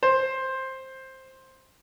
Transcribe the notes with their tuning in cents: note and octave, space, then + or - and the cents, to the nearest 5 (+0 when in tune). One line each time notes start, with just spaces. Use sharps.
C5 +10